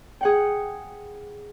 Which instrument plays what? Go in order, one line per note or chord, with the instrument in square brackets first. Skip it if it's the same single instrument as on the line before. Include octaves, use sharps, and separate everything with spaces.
[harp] G#4 F#5 G5